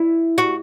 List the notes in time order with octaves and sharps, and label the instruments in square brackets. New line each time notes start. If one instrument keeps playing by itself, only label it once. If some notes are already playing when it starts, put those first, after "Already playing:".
Already playing: [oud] E4
F#4